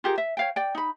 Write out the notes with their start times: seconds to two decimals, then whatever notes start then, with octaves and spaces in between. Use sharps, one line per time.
0.04 F4 G4 G#4 A#4
0.18 E5
0.37 C#5 F5 G5
0.56 D5 G5
0.75 D#4 B5